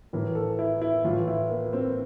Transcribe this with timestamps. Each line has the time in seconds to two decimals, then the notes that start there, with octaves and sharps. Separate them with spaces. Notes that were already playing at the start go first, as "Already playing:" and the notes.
0.13 A2 E3 A#4
0.35 A4
0.59 E4
0.81 E4
1.04 A2 E3 F4
1.28 E4
1.49 A#3
1.73 C4